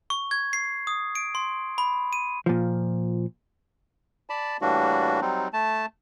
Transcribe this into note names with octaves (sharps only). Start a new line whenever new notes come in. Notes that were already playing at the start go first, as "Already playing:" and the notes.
C#6
G#6
C7
D#6
D7
C6
B5
D#7
A#2 F3
D5 A5 B5
A2 E3 G3 A#3 D4 F#4
F#3 G3 C4 D#4
A3 A5